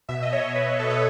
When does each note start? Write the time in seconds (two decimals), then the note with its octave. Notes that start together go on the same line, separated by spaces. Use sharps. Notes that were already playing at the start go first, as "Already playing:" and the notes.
0.09 B2 E5
0.22 D#5
0.33 C#5
0.56 B4
0.79 B2 A4
0.90 B4